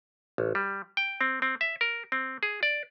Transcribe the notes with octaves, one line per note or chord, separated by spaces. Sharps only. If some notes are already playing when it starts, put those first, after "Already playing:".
A1
G3
G5
C4
C4
E5
A#4
C4
G#4
D5